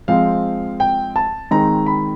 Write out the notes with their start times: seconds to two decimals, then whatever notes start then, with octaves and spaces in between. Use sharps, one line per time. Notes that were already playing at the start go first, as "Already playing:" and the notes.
0.08 F3 G#3 C4 F5
0.80 G5
1.16 A5
1.51 D#3 G#3 C4 D#4 A#5
1.86 B5